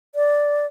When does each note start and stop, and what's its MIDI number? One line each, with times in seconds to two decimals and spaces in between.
0.15 0.66 74